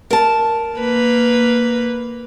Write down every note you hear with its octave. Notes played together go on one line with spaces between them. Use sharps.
A#4 A5
A#3 B4